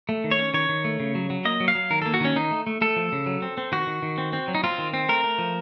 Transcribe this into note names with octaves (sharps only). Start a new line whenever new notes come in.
A3
D#3
C#5
C#4
D#3 C#5
D#3
A3
C#3
F#3
F#3
A#3 D#5
F#3
F5
F#3
D#3 A#4
A#3 A4
F#4
D#3 C#4
D#3 D#4
A3
A3
A3 A4
F3
C#3
F#3
C4
C4
D#3 F#4
D#3
D#3
C4
C4
F#3
D#4
C4 F4
D#3
C4
A3 A#4
A3
F3